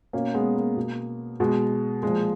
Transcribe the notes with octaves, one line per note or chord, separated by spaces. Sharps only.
B2 A#3 C#4
G#3 B3
A#3
B2
B2 G#3
A#2 F3 G#3